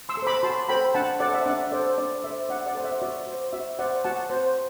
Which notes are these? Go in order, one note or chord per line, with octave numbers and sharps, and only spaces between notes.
C6 E6
A4
C5 B5 D6
F#4 A5 C6
A4 C5 G5 B5
D4 F#5 A5
A4 C5 D5 F#5
E5
D4 D5 F#5
A4 C5 D5
D4 D5
A4 C5 E5
D4 D5 F#5
D5 F#5
A4 C5
E5
F#4 D5
C5
F#4 E5
C5 D5 F#5
F#4 F#5 A5
C5